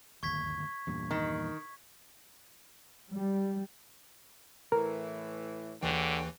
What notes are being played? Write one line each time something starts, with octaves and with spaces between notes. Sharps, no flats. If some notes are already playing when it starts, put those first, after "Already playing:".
D1 G1 D#2 C#6 G#6 B6
E2 G2 A#2
D#3
G3
A2 E3 A#4
D#2 D3 E3 G#4 C#5 G5